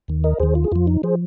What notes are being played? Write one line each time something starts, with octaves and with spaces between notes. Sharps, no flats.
D#2 D#3
A#4 D#5
D#2 D#3 G#4 C5
F4
G#4
F2 F3 F4
D#4
F3 G#4 C5